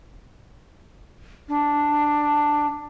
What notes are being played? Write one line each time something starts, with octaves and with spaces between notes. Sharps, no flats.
D4